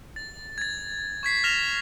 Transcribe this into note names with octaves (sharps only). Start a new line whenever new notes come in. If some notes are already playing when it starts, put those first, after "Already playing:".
A6
G#6 A6
C#6 G#6 B6 C7
F6 A#6 E7 F7 G7